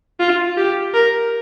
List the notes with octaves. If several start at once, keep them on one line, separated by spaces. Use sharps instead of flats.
F4
G4
A#4